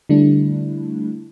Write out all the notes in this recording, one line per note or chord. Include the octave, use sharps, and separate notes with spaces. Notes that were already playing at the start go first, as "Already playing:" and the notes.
D3 G3 A3 D4 E4